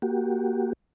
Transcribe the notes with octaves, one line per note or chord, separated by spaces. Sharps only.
A#3 F#4 G4